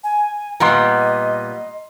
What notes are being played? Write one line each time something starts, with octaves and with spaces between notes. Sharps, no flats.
G#5
A#2 G3 B3 D#5 A#5 C6